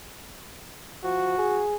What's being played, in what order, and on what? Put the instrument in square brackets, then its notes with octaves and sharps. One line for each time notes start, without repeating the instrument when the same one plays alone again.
[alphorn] F3 [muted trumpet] F#4
[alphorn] G#4